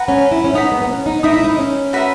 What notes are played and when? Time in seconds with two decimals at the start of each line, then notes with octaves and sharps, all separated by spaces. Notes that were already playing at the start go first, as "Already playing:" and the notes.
Already playing: B4 F#5 A#5
0.08 C#4
0.31 E4
0.44 C#4
0.54 D#4 B4 F#5 A#5 D#6
0.72 B3
0.82 B3
0.89 C#4
1.06 D#4
1.23 D#4 A#4 E5 B5 D#6
1.34 E4
1.44 D#4
1.58 C#4
1.93 F#4 B4 E5 A#5